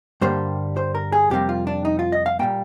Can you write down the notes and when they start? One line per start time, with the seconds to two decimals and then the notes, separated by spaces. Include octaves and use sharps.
0.21 G2 D3 G3 A#3 C5
0.77 C5
0.95 A#4
1.12 G#4
1.30 F2 C3 G3 A#3 G4
1.49 F4
1.67 D4
1.85 D#4
1.99 F4
2.12 D#5
2.26 F5
2.39 A#2 G3 A#3 G5